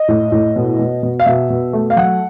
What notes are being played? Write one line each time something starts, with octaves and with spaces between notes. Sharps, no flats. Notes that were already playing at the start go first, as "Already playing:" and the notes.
Already playing: D#5
A2
A2
B2
B2
B2
F5
B2 E5
B2
A3
F5
F#3 F#5